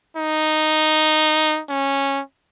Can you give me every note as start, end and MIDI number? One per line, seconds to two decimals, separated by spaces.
0.16 1.61 63
1.69 2.21 61